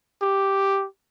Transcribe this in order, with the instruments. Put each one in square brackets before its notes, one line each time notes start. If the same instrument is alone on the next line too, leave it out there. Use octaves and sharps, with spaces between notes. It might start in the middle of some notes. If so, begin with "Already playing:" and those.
[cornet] G4